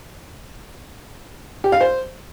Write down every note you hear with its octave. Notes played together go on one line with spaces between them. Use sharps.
G4
F5
C5